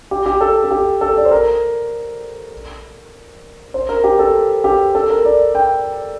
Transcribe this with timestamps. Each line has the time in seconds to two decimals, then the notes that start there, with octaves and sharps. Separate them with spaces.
0.11 G4
0.26 G4
0.41 A4
0.64 A4
0.71 G4
1.01 A4
1.17 D5
1.25 C5
1.31 A#4
3.74 C5
3.89 A#4
4.04 G4
4.19 A4
4.64 G4
4.95 A4
5.10 A#4
5.25 D5
5.55 G5